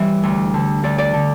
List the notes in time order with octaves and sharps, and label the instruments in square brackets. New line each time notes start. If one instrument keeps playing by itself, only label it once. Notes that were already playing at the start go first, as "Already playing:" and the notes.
Already playing: [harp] E3 G3 E5
D2
D3
D2 D5
D5
D3